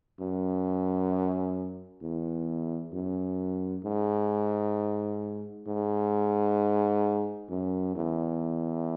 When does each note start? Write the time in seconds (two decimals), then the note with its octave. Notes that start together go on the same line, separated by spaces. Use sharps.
0.20 F#2
2.02 E2
2.93 F#2
3.84 G#2
5.67 G#2
7.50 F#2
7.95 E2